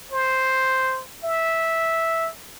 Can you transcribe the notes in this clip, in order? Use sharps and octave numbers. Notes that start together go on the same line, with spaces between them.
C5
E5